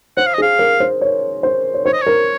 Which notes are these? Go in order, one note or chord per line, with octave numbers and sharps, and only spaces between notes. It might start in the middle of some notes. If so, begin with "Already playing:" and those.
C5 F#5
F5
D#5
G#4
F5
A#4
C5
C#5
C5
C#5
C5 C#5
D#5
A#4 C#5